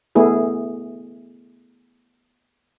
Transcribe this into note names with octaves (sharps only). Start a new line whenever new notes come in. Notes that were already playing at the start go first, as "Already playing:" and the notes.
A3 B3 E4 G#4